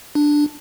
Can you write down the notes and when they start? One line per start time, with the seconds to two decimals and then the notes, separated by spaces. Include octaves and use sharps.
0.15 D4